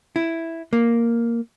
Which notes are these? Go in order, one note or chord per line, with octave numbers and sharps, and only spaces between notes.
E4
A#3